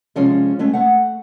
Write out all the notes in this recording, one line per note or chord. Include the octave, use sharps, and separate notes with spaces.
C3 F3 G#3 C#4
G#3 A3 C#4
A3 F#5